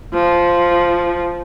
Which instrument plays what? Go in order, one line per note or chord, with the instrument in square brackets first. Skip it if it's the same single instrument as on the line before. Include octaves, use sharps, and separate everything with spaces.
[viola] F3